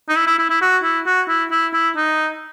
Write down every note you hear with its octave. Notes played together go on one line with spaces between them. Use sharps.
D#4
E4
E4
E4
E4
F#4
E4
F#4
E4
E4
E4
D#4